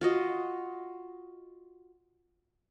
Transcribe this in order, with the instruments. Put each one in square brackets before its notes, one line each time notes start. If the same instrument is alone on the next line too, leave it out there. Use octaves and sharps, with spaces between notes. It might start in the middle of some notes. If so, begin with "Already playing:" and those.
[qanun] F4 F#4 D#5